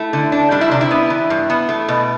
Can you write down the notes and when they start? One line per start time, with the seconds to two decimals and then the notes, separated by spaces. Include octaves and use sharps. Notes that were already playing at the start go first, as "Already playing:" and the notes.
Already playing: A3 E4
0.13 D3
0.32 D4
0.51 G3 D4
0.61 E4
0.71 C3 D4
0.81 E4
0.91 B3
1.10 E3
1.30 G2
1.50 B3
1.69 A3
1.89 B2